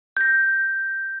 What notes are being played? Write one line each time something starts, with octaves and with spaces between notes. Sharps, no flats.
G6 A#6